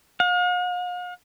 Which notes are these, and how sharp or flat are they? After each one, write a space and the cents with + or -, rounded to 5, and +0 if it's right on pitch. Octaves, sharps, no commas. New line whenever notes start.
F5 +45